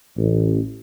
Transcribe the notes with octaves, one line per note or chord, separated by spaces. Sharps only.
A1